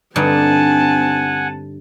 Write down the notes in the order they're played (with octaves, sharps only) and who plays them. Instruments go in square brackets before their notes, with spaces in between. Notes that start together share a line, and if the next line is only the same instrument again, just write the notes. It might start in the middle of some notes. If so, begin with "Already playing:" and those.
[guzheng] G2 D3 D#4 [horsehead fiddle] C4 A5 [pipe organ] F#5 G#5